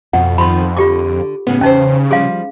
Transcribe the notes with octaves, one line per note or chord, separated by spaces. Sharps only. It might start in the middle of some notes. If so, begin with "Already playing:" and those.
F2 B2 F#5
D#3 F3 B5 C6
D3 F4 G4 D6
A2 C#3 B3 C#4
E2 C#3 C#4 D#4 B4 C5
F3 G3 G#4 F5